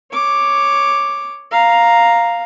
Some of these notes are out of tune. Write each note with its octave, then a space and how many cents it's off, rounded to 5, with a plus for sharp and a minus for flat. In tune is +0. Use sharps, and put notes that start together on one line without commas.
C#5 +0 D6 +0
F5 +0 A#5 +0